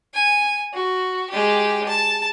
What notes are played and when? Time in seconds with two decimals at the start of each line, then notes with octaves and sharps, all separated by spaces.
0.14 G#5
0.74 F#4
1.30 G#3 G4
1.89 A5